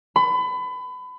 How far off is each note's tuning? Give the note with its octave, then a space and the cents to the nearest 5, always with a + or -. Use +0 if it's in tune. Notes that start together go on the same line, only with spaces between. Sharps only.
B5 +30